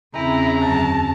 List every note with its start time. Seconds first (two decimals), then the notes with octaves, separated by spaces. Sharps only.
0.15 E2 C#3 C4 E4 A#5
0.60 F#2 D3 F#3 A5